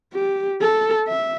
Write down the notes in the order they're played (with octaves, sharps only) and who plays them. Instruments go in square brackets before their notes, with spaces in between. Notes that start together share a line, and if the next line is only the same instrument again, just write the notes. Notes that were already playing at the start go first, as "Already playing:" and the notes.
[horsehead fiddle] G4
A4
E5